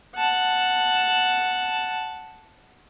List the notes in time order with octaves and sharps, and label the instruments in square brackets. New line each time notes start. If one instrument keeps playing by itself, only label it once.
[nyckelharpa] F#5 A5